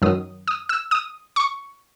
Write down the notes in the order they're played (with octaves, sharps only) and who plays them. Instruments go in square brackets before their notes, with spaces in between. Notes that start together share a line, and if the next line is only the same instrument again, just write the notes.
[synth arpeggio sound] F#2 D#3 F#3 D#6
D#6
E6
D#6
C#6